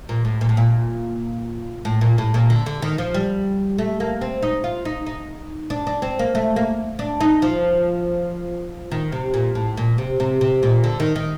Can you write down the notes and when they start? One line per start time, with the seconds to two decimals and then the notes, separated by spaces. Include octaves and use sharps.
0.09 A#2
0.25 A2
0.41 A#2
0.49 A2
0.57 A#2
1.85 A2
2.01 A#2
2.18 A2
2.34 A#2
2.50 D3
2.66 D3
2.82 D#3
2.98 F3
3.14 G3
3.78 A3
4.00 A#3
4.21 C4
4.42 D#4
4.64 F4
4.85 D#4
5.06 D#4
5.70 D4
5.87 D4
6.02 C4
6.19 A#3
6.35 A3
6.56 A#3
6.99 D4
7.21 D#4
7.42 F3
8.91 D#3
9.12 C3
9.34 A#2
9.55 A2
9.77 A#2
9.98 C3
10.20 C3
10.41 C3
10.63 A#2
10.84 D3
11.00 D#3
11.16 D#3